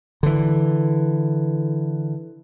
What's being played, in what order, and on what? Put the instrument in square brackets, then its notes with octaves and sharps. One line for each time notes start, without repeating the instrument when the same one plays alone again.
[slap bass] D3 E3